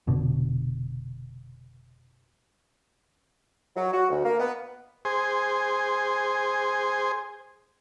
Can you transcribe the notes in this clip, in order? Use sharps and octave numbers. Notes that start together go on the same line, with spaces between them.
F1 B2 D3
F#3
F#4
D2
A#3
B3
G#4 C5